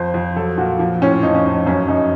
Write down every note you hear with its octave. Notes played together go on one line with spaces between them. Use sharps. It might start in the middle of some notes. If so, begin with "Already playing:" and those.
Already playing: F2 C5
F2
F#3 A4
A#2 F#4
F3
A2 C#4
F2 D#4
C#4
F2 D#4
F#2 C#4
F#2 D#4